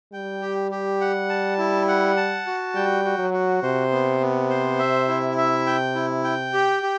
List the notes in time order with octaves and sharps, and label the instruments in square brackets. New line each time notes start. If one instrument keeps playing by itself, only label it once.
[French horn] G3 [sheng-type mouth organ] G5
[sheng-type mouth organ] G4
G4
F#5
A5
E4
F#5
A5
F#4
[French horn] G3 [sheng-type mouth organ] G5
[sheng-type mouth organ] F#4
[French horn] F#3
[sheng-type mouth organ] F#4
[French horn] C3 [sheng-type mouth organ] C5
[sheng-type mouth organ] B3
B3
C5
E5
E4
E5
G5
E4
G5
G4
G4